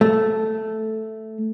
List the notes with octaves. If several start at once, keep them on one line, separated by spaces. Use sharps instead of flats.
A3